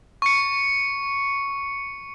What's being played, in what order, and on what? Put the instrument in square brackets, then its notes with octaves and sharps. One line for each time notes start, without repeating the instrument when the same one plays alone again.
[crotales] C#6 C#7